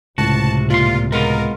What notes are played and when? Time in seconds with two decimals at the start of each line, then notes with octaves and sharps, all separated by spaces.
0.18 C#2 A2 C3 F#4 A5
0.70 A#2 F4 C6
1.12 G#3 B3 F4 A#4